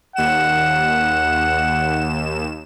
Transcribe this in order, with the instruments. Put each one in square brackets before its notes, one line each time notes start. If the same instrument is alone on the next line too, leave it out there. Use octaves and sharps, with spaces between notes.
[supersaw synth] D#2 E7 [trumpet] F#5